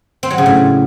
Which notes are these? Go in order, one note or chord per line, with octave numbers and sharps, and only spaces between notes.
C4
F#3
C#3
A2